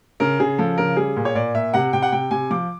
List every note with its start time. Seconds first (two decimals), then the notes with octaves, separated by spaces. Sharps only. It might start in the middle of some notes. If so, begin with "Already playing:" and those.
0.20 C#3 A#4
0.39 C#3 G#4
0.58 F3 A4
0.78 C#3 A#4
0.96 G3 G#4
1.16 A#2
1.25 C#5
1.35 A#2 D5
1.54 A#2 E5
1.74 C3 F#5
1.93 C3 G5
2.02 F#5
2.12 C3 G5
2.31 C3 G#5
2.50 F3 D6